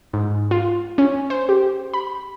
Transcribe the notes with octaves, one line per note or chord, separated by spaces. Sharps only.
G#2
F4
C#4
C5
G4
B5